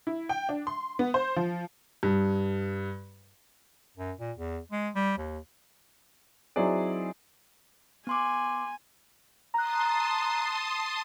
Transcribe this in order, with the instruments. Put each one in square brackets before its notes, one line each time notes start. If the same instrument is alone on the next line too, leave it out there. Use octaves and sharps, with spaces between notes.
[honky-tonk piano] E4
G5
D4
C6
B3
C5
F3
[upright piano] G2
[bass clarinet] F#2
A#2
E2
G#3
G3
D#2
[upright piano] F#3 C4 D#4 E4 G#4 D5
[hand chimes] B3 C6 D6 [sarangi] G#5
[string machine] A5 C6 D#6 [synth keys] A#5 F#6